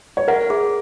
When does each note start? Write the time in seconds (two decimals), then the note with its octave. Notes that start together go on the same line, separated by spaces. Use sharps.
0.17 C#5
0.28 A#4 F#5
0.50 G#4